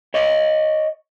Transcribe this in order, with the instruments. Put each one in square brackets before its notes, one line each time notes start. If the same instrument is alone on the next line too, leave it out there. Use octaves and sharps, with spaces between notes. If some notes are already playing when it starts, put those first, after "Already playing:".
[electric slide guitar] C#5 D#5